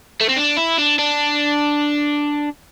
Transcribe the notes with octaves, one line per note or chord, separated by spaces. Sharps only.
A3
C4
D4
E4
D4
D4